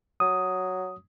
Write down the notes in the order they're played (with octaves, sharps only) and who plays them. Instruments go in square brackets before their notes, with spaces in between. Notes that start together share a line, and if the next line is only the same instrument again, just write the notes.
[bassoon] F#3 [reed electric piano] D#6